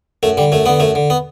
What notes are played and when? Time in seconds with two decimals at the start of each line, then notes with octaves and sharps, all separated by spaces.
0.23 F#2 A3
0.37 D3 G3
0.52 F#2 A3
0.66 D3 B3
0.80 F#2 A3
0.95 D3
1.10 B3